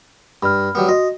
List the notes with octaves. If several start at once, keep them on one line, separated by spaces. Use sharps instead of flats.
G2 B5 F6
F#3 G3 B3
F#4 D#5